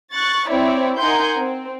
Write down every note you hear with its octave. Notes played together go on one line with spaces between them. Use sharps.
C#6 F#6 A6
C4 E4 C#5 D5
D#4 A#4 F#5 G#5 C6 G6
C4